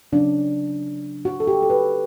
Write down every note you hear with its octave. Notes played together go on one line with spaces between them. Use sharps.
C#3 F#3 C#4 D4
F#4
A4
G4
A4
B4